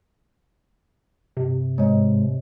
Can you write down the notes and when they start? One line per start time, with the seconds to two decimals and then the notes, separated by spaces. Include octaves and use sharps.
1.37 G2 C3
1.78 G#2 C#5 D#5